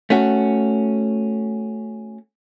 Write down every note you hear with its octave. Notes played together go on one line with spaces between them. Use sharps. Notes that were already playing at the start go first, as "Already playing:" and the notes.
A3 C#4 F#4